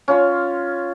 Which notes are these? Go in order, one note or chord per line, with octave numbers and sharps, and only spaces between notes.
C#4 F4 C6